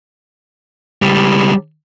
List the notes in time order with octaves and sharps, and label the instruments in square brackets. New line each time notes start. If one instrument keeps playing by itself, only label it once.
[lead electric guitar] C#2 G3